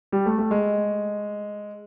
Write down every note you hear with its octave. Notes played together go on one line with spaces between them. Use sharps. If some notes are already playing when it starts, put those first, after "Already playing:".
G3
A3
A3
G#3